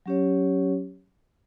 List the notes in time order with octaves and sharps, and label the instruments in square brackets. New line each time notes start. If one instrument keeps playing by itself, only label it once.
[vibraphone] F#3 C#4 G4 C#5